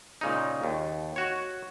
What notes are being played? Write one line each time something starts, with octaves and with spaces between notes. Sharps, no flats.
A#2 C#3 D#4
D#2
F#4 C#5